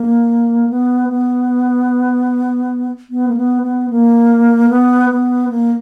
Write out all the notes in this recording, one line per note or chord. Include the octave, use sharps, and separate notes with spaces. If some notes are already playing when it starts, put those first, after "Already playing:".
Already playing: A#3
B3
B3
B3
A#3
B3
B3
A#3
B3
B3
A#3